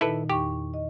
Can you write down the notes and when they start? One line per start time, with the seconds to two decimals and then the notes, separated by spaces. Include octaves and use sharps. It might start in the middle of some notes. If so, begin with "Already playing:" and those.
0.01 A#2 D#3 D#4 E4 A4 B4
0.30 E2 D#4 G4 C#6
0.74 D#5